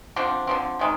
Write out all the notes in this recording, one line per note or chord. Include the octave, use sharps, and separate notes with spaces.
D3 F3 C4 D4
D3 F3 C4
C3 D#3 G#3